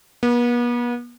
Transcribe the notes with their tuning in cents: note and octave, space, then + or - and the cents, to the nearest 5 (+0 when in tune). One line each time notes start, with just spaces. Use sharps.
B3 -40